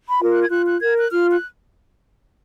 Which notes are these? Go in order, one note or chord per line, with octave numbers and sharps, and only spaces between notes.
B5
F4 A#4
F#6
G#6
F4 F#6
F#6
A#4 G#6
F#6
F4 F6
F#6